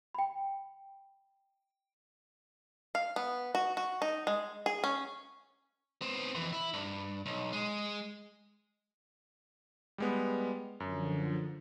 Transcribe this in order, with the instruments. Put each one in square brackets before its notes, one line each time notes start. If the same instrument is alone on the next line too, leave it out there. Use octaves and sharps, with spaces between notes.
[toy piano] G5 B5
[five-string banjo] F5
B3
F#4
F#4
D#4
G#3
G#4
C#4
[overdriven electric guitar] B3 C4
F2 E3
E4
G2
B1
G#3
[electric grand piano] G3 G#3 B3
[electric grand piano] F#2 [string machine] D3 F3